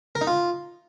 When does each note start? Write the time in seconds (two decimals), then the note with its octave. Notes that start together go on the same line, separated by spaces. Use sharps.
0.15 A#4
0.21 D#4
0.27 F4